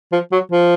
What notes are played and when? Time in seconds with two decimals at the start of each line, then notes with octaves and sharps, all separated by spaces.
0.12 F3
0.32 F#3
0.52 F3